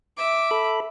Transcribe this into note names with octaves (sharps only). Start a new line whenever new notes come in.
E5 D6
A4 B5